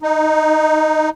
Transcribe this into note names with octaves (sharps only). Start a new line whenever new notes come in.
D#4